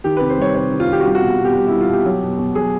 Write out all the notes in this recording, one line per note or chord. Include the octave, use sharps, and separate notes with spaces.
D#3 G4
C3 B4
C5
G3 C#5
C3 C#5
D#3
F4
C3 G4
F#4
G3 F4
F#4
B2
B2
G4
G3 F#4
G3 E4
F4
B2 G4
F#3
B2
B2
F#3 G#4